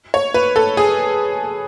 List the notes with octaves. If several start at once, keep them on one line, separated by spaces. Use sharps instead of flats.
C#5
B4
A4
G#4